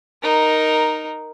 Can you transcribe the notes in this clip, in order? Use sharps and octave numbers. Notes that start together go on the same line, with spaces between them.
D#4 A#4